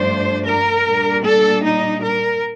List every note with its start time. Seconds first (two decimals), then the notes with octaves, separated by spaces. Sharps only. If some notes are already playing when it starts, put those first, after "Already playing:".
Already playing: G2 F3 A3 D4 C5
0.45 A#4
0.85 A#2 G3 D4
1.24 A4
1.63 D#4
2.03 A#4